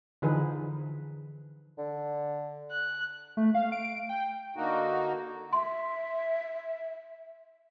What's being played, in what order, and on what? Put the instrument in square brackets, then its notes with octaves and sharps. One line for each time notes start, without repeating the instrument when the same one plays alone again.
[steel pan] D3 E3 F3 D#4 G#4 B4
[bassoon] D3
[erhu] F#6
[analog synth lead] A3
F5
D7
G5
[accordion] D3 A#3 D#4 F#4
[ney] E5 [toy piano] C6